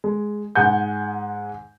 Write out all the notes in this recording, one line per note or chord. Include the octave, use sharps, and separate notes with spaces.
G#3
G#2 G#4 F#5 G#5 G6